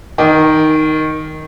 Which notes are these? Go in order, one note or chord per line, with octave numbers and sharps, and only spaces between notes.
D#3